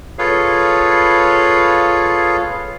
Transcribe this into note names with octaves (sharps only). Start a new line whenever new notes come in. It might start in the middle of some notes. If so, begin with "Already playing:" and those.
F4 G#4 A4 B4 C#5 F5